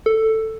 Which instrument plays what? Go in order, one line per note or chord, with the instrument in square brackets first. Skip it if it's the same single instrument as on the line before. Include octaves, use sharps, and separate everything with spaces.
[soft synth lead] A4